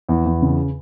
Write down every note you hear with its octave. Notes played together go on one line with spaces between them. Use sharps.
E2
E2
C#3